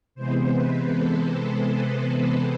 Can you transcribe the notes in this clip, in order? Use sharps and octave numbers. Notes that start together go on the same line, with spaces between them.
C3 E3 G#3 B3 C5
B4
A4
C5
C5